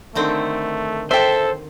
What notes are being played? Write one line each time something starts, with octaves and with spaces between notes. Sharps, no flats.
D3 D#3 A3 C4
A4 C5 E5 G5